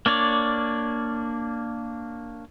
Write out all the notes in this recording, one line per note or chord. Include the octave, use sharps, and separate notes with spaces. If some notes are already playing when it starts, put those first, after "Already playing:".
A#3 D4 C#5 D5